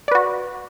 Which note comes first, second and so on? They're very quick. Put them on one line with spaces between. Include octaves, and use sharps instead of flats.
D5 B4 F#4